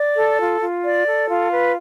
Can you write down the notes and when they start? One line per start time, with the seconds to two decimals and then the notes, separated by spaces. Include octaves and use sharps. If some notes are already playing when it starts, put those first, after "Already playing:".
Already playing: D5
0.16 A4
0.38 F4
0.61 F4
0.83 D5
1.06 A4
1.28 F4
1.51 B4